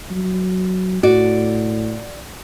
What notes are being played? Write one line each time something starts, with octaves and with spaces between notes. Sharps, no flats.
F#3
A2 F#4 D5